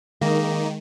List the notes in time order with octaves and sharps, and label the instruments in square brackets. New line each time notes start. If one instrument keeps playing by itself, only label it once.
[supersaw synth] D#3 [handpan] G#3 [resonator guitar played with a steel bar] A#3 D#4